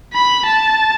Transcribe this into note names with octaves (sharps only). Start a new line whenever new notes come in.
B5
A5